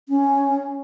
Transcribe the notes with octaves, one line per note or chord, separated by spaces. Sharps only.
C#4